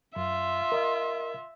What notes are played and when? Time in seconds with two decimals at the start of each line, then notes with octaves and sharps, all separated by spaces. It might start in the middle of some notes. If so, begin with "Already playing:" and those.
0.16 F#2 F4 E5
0.72 A#4 D#5